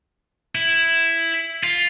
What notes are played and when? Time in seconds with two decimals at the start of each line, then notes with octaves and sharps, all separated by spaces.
0.55 E4
1.63 F4